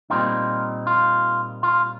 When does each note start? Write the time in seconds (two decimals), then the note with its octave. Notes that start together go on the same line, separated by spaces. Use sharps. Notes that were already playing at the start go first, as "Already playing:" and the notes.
0.10 A#2 G3 C4 D#4 F4
0.87 F4
1.63 F4